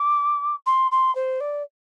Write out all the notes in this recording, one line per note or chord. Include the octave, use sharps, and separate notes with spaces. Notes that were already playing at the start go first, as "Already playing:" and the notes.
Already playing: D6
C6
C6
C5
D5